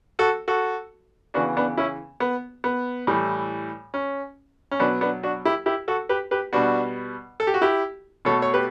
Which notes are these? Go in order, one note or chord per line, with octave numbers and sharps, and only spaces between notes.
F#4 A4
F#4 A4
C#3 E3 B3 D4 F#4
B3 D4
C#4 E4
B3
B3
A2 E3 G3
C#4
C#4
B2 F#3 B3 D4
B3 D4
D4 F#4
E4 G4
E4 G4
F#4 A4
G4 B4
G4 B4
B2 G3 B3 D4 F#4
A4
G4
F#4
E4 G4
B2 A3 A4 C#5
C#5
G4 B4